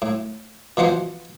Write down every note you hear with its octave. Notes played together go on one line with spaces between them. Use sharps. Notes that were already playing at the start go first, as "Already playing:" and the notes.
A2
B2 E3 F3 C5 F#5